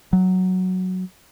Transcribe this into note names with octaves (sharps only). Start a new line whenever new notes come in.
F#3